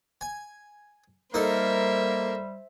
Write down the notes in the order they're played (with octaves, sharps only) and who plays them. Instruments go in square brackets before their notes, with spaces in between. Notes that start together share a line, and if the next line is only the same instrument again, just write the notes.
[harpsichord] G#5
[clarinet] G3 [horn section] A#3 A#4 [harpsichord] D#4 A4 [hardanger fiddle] C5 E5